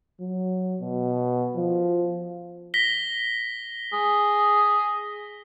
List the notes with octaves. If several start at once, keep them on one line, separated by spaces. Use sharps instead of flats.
F#3
B2
F3
A#6 B6 G7
G#4